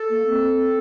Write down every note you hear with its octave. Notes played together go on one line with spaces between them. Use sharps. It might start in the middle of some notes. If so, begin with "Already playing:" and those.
Already playing: A4
A#3
C4